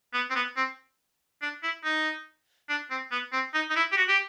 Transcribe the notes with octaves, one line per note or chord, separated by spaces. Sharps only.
B3
C4
B3
C4
D4
E4
D#4
D4
C4
B3
C4
D#4
D#4
E4
G4
F#4
G4